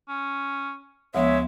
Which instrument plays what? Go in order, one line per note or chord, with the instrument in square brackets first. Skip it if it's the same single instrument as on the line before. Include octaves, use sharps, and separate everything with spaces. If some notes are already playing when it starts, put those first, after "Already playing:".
[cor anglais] C#4
[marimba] D2 F3 B3 [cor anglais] G#3 [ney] C#5 [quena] E5